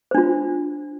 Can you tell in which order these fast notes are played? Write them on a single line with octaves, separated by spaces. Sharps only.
C5 D4 F4